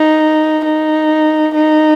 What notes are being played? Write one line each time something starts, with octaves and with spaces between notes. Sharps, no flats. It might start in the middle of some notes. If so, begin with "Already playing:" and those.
Already playing: D#4
D#4
D#4